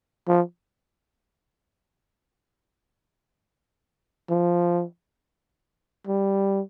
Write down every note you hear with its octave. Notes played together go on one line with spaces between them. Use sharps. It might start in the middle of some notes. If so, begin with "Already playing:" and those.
F3
F3
G3